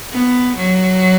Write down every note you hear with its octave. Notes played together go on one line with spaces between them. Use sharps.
B3
F#3